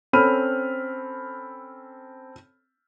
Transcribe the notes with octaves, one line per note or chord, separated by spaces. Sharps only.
C4 C#4 A4 B5 F6 D#7